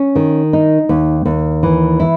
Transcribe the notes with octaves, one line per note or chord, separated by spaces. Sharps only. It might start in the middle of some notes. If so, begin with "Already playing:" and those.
Already playing: C#4
D#3
D#4
D#2
D#2
E3
E4